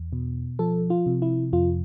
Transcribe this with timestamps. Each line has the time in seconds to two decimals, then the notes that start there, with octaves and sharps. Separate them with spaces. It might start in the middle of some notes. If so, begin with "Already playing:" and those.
Already playing: E2
0.13 B2
0.59 F3 A4
0.90 F4
1.06 C3
1.22 E4
1.53 F2 F4